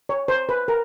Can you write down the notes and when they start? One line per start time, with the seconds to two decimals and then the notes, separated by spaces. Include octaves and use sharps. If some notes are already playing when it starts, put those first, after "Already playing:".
0.09 C#5
0.28 C5
0.49 B4
0.68 A#4